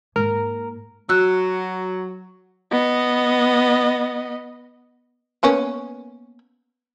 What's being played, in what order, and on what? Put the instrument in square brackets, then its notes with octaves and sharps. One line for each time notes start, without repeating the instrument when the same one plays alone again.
[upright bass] G#2 A#3 [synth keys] A#4
[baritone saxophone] F#3 [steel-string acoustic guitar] F#4 [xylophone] E6 F#6
[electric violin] B3 D#5
[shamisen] A#3 B3 C#4